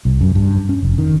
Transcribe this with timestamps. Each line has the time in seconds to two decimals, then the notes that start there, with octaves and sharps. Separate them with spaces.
0.05 C2
0.21 F#2
0.35 G2
0.69 C#4
0.83 F1
0.98 D#3